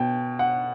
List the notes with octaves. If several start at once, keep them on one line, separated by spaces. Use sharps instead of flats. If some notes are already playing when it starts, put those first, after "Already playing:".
Already playing: B2 G5
F#5